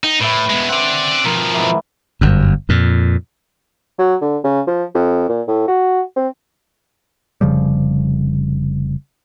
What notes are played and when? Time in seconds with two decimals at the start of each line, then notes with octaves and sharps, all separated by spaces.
0.04 D#4 G5
0.20 A2 B4 E5
0.50 B2 G#3
0.69 C4 D5 F#5
1.25 B2 F3 A#4
1.54 G#2 E3 E5
2.21 G1 F#2
2.69 F2 A#2
3.99 F#3
4.21 D3
4.44 C#3
4.67 F3
4.94 F2
5.29 A#2
5.48 A2
5.68 F#4
6.16 C4
7.41 F1 C#3 F3 G3